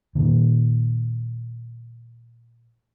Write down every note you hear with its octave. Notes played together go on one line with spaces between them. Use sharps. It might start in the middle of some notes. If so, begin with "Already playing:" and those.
A#2 D#3